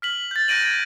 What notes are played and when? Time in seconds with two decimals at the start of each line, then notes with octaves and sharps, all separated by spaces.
0.02 F6 B6 F#7
0.31 G6 A6
0.48 F#6 G6 A#6 D7 D#7 F#7
0.63 G#6 A#6